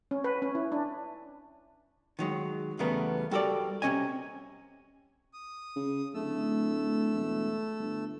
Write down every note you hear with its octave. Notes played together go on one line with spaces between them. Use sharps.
C#4
B4
C#4
E4
D4
D#3 F#3 G#3
E2 C#3 G3 A3 B3 A#4
G3 F#4 A4 A#4 D5
C3 F#3 C#4 D#5 G#5
D#6
C#3
D1 A3 E6
E1
G1